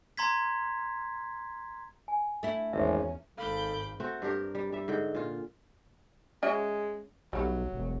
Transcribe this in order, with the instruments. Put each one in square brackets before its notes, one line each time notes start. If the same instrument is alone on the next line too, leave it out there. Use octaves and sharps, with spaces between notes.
[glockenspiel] A#5 C6 G#6 B6
[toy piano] G#5
[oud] A3 E4
[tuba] G#1 [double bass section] E2 C#4 [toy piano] E5
[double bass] G#1 G#2 [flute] A4 [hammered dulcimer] F5 [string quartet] B5 D6 G6
[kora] A3 C4 F#4
G2 D4 G4 A#4
G3
G3 E5
G#2 D3 G5
A#2 F4
[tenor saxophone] G#3 [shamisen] C#4 F#4 E5
[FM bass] B1 [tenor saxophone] F#3 [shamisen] G3 A3
[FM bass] E1